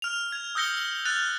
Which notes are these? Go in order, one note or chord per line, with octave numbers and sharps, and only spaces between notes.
F6 F7
G#6 F7
D#6 E6 G6 A#6 C#7 G7
F6 F#6 A6 F7